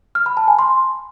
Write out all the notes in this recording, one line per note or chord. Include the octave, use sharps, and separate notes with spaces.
F6
B5
A5
G#5
C6